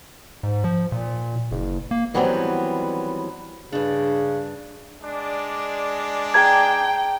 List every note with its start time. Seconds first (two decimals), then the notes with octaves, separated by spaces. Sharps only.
0.43 G#2
0.64 F3
0.92 A#2
1.51 F#1
1.91 A#3
2.14 D#3 E3 F#3 G3 B3 C4
3.72 G2 C#3 D4
5.02 G#3 D4 D5
6.34 G#4 G5 A5 A#5 G#6